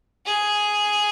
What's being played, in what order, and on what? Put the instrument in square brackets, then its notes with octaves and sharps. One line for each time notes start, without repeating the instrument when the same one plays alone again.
[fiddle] G#4